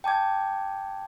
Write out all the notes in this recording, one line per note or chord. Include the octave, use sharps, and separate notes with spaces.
G5 A5 D6 G#6